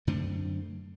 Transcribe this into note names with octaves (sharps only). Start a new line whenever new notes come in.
F#2 D3 A3 C4